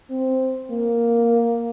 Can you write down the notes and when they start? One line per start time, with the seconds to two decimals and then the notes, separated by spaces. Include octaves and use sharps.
0.10 C4
0.70 A#3